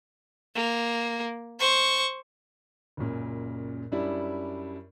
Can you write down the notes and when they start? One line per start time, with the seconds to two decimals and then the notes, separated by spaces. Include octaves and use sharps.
0.55 A#3
1.60 C5 C#6
2.97 C#2 F#2 A#2 C#3
3.92 F#2 G3 D4 E4